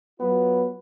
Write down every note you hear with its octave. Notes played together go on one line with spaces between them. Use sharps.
F#3 B3 F4 B4